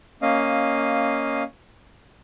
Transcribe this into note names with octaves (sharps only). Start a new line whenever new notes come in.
A#3 C#4 D#5 F5